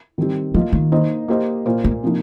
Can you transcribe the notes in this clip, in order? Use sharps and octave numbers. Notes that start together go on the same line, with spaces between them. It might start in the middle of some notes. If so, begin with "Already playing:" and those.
D#3 G3 C4 G4
F3 A#3 F4 D#5
D#3
A#3 D#4 C5 D#5
A#3 G4 C5 D#5
A#2 A#3 F4 C5
A#3
C3 F3 A#3 D#4